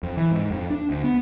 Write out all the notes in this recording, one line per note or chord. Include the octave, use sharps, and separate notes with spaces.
F2
E3
G#2
F2
D4
D2
B3